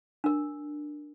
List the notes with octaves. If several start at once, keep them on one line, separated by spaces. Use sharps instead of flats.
D4 A#4